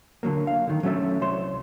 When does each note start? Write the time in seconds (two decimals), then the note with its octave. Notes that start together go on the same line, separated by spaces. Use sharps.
0.23 D3 F#3 A#3
0.47 F5
0.67 D3 D#3
0.83 F#3 A3 C#4 F#4 A4 E5
1.22 C2 C#5 C6